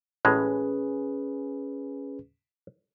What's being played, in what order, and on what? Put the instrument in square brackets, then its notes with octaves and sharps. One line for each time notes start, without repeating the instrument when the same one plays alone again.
[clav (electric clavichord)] A1 A2 G#3 [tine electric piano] C#4 G#4 B4